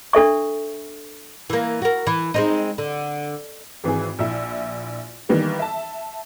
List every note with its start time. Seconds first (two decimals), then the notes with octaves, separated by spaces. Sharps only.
0.13 D4 A4 E5 C#6
1.50 E3 A#3
1.82 F#4 A#4
2.07 E3
2.34 G#3 C4 D#4
2.78 D3
3.84 G#1 E3 C4 G#4
4.19 A#1 E4
5.29 D#3 E3 G3 A#3 B3
5.59 E5 A5